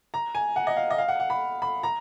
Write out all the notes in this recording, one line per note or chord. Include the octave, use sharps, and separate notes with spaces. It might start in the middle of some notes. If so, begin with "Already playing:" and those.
A#5
G#5
F#5
D#5
F5
D#5
F5
F#5
F#5
B5
B5
A#5